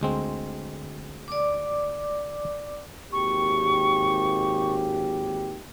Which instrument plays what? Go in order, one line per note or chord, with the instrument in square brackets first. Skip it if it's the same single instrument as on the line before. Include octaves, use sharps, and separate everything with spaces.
[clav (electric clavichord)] D2 G#3 C4
[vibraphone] D5 D6
[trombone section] G#1 D#2 G4 [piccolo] C#6